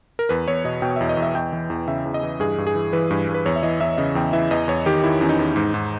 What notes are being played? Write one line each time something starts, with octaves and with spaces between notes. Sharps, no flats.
A#4
E2 B4
E2 C#5
B2 D#5
B2 G5
E5
E2
D#5
E2
E5
E2 G5
E3
E2
C#3 E5
E2
D#5
E3
G2 G#4
G2
G#4
E3
E3 B4
G2
G2
B4
E2 C#5
E5
E3 D#5
E2 E5
C#3 D#5
E2 G5
E3 E5
E2 D#5
E2 C#5
D#3 G4
D#3 E4
E2 C#4
D#4
E2
G#2
G#2